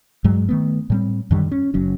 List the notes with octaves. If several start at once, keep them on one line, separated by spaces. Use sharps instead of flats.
G2 F#3 G#3
D#3 A3 B3
A2 G3 C4
F#2 D3 D#3 G3
C#4
F#1 F#3 C#4